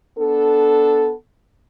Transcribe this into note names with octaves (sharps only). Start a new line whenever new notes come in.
B3 D4 A4